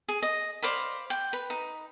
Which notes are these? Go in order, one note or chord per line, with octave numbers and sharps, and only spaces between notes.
G#4
D#5
C5 D5 F5 B5
G5
B4
D#4